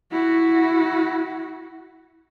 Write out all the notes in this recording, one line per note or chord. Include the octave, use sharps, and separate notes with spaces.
E4 F#4